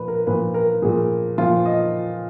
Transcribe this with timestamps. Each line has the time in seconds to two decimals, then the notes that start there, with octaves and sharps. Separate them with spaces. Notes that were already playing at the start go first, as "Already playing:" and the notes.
Already playing: A#2 F3 B4
0.08 A#4
0.27 A#2 F3 B4
0.54 A#4
0.82 A#2 F3 G#4
1.38 A#2 F3 F4
1.66 D#5